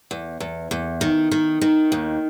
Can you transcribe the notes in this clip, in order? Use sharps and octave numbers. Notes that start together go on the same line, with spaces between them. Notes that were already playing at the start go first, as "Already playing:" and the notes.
E2
E2
E2
D#3
D#3
D#3
D#2